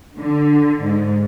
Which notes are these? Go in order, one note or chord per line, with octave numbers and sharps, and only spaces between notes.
D3
G#2